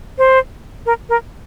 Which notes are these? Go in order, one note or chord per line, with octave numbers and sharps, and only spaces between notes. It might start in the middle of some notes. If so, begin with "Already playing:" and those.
C5
A#4
A#4